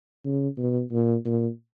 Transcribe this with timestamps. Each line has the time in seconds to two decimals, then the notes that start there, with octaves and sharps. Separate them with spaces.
0.25 C#3
0.58 B2
0.92 A#2
1.25 A#2